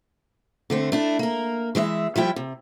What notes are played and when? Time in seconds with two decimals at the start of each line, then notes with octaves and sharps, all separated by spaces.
0.70 D3 A3 C4
0.92 A3 D4 E4
1.19 A#3 A#4
1.75 E3 G#3 C#5 E5
2.16 F3 G3 E4 G5
2.36 C3